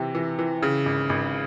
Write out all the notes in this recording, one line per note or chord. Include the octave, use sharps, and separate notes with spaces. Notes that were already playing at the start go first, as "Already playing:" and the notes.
Already playing: C3 E3
E3
E3
C#3
G#1
G#1